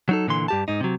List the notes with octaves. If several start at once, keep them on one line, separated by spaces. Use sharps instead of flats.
F#3 D#4 A4
A#2 D3 E3 C6
G2 G4 A5
G#2 D#4
C3 F#3